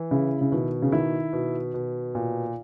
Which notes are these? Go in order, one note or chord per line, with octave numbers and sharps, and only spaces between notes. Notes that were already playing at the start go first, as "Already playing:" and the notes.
Already playing: E3
C#3 E4
C#3
B2 D#3
C#3
D#3 E4
B2
B2
A#2